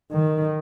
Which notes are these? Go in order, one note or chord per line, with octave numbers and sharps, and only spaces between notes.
D#3